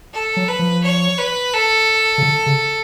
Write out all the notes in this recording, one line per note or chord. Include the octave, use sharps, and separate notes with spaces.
A4
F#3
B4
F3
C#5
B4
A4
C#3
D3
C#3